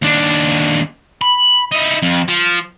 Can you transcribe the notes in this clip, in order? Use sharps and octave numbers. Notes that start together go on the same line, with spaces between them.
D#2 D4
B5
D#4 E4
F2
F3